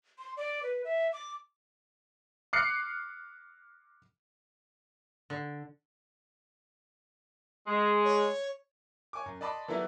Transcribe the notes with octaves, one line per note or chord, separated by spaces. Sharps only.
C6
D5
B4
E5
D6
D6 F6 F#6 C7 C#7
D3
G#3
C#5
C#5 G#5 C#6 D6
F#2
D5 D#5 A5 B5 C6 D6
E3 F#3 G3 A3 B3 E4